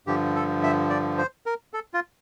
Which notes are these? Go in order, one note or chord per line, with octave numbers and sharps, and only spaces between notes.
G2 D3 F3 G4
A4
E5
D5
C5
A#4
A4
F4